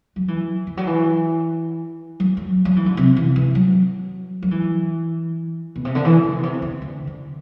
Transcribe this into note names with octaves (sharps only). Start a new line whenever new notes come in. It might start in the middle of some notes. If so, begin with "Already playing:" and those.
F#3
E3
E3
F#3
E3
F#3
F#3
F#3
E3
D3
C3
E3
E3
F#3
F#3
E3
B2
C3
D3
E3
D3
B2
C3
D3
D3
D3